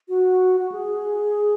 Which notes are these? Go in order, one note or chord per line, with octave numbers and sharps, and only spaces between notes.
F#4
F#4
G#4